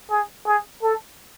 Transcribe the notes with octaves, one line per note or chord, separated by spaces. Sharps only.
G#4
G#4
A4